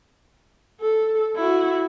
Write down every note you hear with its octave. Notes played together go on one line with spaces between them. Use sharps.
A4
E4 F#4